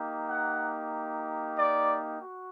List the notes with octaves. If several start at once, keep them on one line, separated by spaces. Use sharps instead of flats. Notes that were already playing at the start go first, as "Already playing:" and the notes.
Already playing: A#3 D#4 G4
F#5
D5
F#4